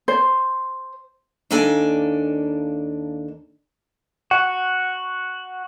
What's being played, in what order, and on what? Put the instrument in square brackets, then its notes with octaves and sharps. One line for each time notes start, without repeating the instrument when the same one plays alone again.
[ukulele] C5
[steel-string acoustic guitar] D#2 A#3 D4 A4 D5 G#5
[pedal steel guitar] F#4 [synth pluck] F#5